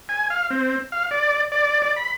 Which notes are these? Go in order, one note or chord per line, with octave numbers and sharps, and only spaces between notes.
G#5
F5
C4
F5
D5
D5
D5
B5